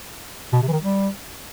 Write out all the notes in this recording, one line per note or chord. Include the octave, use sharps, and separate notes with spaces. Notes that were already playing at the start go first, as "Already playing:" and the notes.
B2
C3
E3
D#3
G3